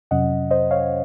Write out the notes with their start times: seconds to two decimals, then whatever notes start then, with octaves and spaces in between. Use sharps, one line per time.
0.11 F2 C3 F#3 C#4 D#5 F#5
0.51 C5 D#5
0.71 C#5 F5